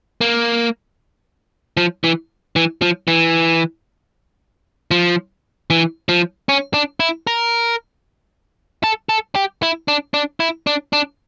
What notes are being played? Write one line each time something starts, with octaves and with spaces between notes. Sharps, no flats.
A#3
F3
E3
E3
F3
E3
F3
E3
F3
C#4
D4
E4
A#4
A4
A4
G4
E4
D4
D4
E4
D4
D4